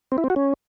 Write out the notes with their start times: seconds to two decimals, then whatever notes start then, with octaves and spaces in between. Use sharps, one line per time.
0.12 C4
0.18 E4
0.24 C4
0.30 F#4
0.36 C#4